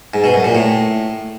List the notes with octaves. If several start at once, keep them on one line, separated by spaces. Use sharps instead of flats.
G#2
B2
F#2
A#2
A2